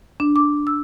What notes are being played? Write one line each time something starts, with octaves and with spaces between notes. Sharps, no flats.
D4
D6
E6